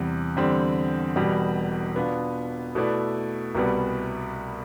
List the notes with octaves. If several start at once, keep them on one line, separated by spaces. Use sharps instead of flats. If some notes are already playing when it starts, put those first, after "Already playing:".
Already playing: E2 C3 G3
E2 D3 G3 C4
E1 E2 B2 G3
B2 B3 D4 F4
B2 A3 E4 B4 D5
C2 B2 G3 B3